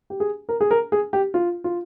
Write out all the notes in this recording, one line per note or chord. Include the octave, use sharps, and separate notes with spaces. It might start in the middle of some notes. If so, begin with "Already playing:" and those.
G4
G#4
A#4
G#4
A#4
G#4
G4
F4
F4